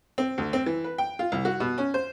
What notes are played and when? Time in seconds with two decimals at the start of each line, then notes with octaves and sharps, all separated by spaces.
0.18 C4
0.38 D2
0.53 C4
0.66 E3
0.84 B4
0.98 G5
1.19 F4
1.32 C2
1.45 F#4
1.60 B2
1.78 C#4
1.94 C5